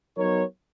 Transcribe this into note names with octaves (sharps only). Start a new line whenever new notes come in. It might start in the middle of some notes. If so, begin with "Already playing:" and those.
F#3 B3 D#4 A#4 C#5